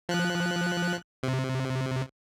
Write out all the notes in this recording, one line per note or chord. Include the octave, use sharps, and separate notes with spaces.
F3 F#6
C3